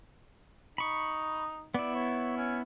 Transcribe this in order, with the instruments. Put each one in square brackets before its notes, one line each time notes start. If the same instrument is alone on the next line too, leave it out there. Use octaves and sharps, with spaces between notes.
[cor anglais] D#4 [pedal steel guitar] B5 C#6
[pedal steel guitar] B3 E4 [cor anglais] D5
[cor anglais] C#5
C#4